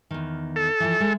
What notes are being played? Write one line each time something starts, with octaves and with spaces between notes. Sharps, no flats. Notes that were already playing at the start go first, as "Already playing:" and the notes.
E2 D#3
A4
E3 F3
G#3